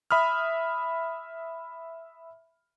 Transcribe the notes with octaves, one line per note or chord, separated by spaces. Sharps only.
E5 B5 D#6 F6